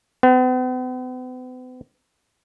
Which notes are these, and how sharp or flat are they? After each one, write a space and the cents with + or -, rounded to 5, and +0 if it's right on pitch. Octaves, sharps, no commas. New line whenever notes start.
B3 +45